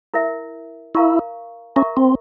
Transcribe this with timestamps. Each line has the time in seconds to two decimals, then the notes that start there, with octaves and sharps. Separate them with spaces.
0.14 E4 A#4 E5
0.95 E4 A#4 F5 A#5 C#6
1.76 C#4 A#4 E5 A#5 C#6
1.97 C4